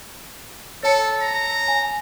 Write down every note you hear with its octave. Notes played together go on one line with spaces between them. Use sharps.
A4 C#5 A5 C#7
A#5
G#5